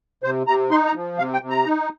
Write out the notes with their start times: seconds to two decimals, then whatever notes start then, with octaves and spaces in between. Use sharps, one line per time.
0.23 C3 C5
0.47 C3 A#5
0.71 D#4 C6
0.87 A#5
0.95 F3
1.18 C3 F5
1.34 G5
1.42 C3
1.50 A#5
1.66 D#4